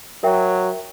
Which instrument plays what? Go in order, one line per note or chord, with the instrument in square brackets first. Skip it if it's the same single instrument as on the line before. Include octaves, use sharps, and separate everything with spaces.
[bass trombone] F#3 [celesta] A#4 E5 G5